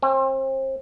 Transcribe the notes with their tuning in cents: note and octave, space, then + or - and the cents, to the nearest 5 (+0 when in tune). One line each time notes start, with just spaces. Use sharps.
C4 +35